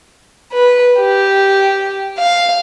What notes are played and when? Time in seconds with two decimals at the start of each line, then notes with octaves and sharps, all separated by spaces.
0.52 B4
1.00 G4
2.20 F5